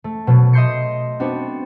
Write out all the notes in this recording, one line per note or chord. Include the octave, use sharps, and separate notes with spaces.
A3
B2 F#3
D#5 E5 C6 G6 C7 C#7
B3 C4 D4 F#4